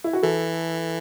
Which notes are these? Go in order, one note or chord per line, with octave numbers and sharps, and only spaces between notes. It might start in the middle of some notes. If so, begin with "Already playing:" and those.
E4
F#4
E3 A4